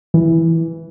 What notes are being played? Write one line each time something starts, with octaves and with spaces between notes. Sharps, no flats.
E3